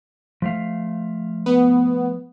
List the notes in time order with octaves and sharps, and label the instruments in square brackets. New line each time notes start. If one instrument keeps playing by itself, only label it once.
[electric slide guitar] F3 A3 F5
[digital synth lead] B3